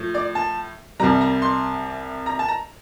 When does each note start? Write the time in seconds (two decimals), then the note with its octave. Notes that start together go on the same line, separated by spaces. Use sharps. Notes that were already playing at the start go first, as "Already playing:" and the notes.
Already playing: A2 F3
0.14 D5
0.35 A5
1.00 C2 C3 G3 A#5
1.21 A#5
1.42 C6
2.26 A#5
2.39 A5
2.49 A#5